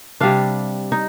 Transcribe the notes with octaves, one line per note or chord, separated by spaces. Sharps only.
C3 G3 D4 F5
D#4